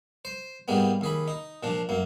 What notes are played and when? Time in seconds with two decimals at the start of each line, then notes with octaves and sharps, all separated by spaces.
0.25 C5
0.68 G#2 G3 G#3 A#3 B3
1.01 D#2 G#4 B5
1.28 D#4
1.63 A#2 F3 D4
1.89 F#2 A#3